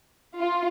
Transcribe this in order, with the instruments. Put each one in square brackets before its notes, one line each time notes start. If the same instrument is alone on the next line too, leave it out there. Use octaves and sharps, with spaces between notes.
[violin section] F4